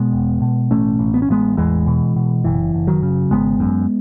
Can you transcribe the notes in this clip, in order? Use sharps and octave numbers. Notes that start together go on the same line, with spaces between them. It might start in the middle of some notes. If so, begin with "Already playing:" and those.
Already playing: B2 G#3 B3
E1
B2
A1 A3 C#4
A1
B3
C#4
A1 G#3 B3
E2 E3 G#3
B2
B2
F#1 E3
F#1
D#3 F#3
C#3
G#1 G#3 B3
F#2